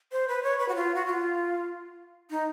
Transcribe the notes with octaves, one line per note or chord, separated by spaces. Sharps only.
C5
B4
C#5
B4
F#4
F4
F#4
F4
D#4